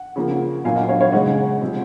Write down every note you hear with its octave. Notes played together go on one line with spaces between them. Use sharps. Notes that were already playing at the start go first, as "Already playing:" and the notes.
Already playing: F#5
C#3 F3 A#3
A#2 F#3 A#3 F5 G#5
D#5 F#5
C#5 F5
C#5 F5
C#3 G#3 D#5 F#5
C3 F3 G#3